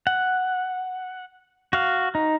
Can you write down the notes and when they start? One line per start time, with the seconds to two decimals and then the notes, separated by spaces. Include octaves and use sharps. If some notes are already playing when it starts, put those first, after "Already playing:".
0.07 F#5
1.73 F#4 F5
2.15 D#4